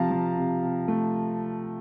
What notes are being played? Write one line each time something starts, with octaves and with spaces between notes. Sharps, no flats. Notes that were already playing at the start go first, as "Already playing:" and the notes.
Already playing: C3 F3 F5 A5 A#5
F3
C3
C3
A3